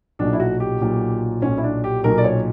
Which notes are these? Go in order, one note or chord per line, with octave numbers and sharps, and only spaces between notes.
B1 A#2 F#3 D4
E4
F#4
G4
B1 A#2 F#3
B1 A#2 F#3 C#4
E4
D4
G4
B1 A#2 F#3 A#4
D5
C#5